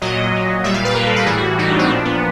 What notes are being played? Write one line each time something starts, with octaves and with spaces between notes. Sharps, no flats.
A#2 F#3 D#5
A#2 F#3
A#2 G3 E5
F5
B4
A#2 G3 A#4
A4
A4
A2 E3 G3 G#4
F#4
A2 E3 G3 D#4
D4
C4
A#2 F3 D4
B3